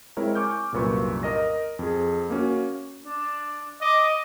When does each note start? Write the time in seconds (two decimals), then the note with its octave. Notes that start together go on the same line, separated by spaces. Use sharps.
0.17 G#3 C4 E4 A#4 C#5
0.35 G#5 C#6 D6 F6 G6
0.72 C2 F#2 A#2 B4 C#6
1.23 A#4 D#5 A#6
1.79 F2 G#4
2.30 A#3 C#4 F#4
3.03 D4
3.81 D#5 D6